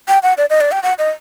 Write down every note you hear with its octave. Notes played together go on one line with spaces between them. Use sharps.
G5
F#5
D5
D#5
D5
G5
F#5
D#5